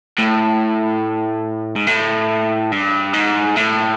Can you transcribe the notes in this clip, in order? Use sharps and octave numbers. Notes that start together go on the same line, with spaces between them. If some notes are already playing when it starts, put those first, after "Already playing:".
A2
G#2
A2
G2
G#2
A2